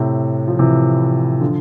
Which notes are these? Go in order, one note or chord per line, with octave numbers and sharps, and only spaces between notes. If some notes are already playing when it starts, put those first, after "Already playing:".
Already playing: A2 C3
F3
C3 E3
D3 F3